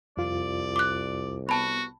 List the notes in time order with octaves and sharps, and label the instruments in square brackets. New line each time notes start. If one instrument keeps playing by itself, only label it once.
[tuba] C2 [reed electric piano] F2 F4 [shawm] D5
[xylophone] D6 F#6
[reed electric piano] B3 [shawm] F#4 [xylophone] A5 B5